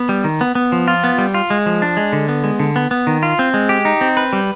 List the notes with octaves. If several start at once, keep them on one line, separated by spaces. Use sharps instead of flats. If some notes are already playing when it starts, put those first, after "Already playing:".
Already playing: B3
G3
D#3
B3
B3
F3
F4
B3
G3
F4
G#3
F3
D4
G#3
D3
B3
G#3
D3
B3
B3
D#3
F4
C4
G#3
G4
D#4
C4
B4
G3